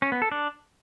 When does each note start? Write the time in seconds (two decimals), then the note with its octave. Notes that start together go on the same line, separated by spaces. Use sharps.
0.02 C#4
0.12 B3
0.22 A4
0.32 D4